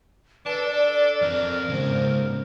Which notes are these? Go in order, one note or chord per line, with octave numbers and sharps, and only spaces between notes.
D4 A4 B4 A5
D5
F3 C4 A#4
G#2 C#3 C5